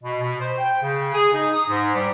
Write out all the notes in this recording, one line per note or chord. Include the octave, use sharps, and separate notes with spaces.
B2
B2
C5
G5
C#3
G#4
D#4
D#6
G#2
G3